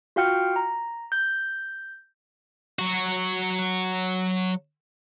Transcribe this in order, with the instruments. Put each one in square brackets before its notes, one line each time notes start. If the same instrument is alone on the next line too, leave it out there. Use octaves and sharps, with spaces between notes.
[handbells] F4 F#4 F5 G5 F6 C#7
A#5
G6
[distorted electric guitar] F#3 F#4